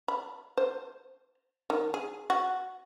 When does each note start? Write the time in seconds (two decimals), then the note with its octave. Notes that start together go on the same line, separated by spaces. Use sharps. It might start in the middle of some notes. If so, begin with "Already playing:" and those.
0.08 B5
0.57 C5
1.70 D#3
1.94 G#4
2.30 F#4